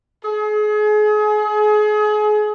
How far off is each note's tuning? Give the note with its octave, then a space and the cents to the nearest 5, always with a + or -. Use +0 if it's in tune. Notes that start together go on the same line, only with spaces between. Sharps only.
G#4 +35